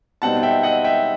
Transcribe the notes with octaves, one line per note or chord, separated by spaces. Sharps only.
B2 G3 C4 D#4 F#5 A5
E5 G5
D#5 F#5
E5 G5